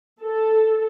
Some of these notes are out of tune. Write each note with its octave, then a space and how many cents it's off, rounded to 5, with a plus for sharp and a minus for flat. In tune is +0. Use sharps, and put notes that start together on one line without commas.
A4 +0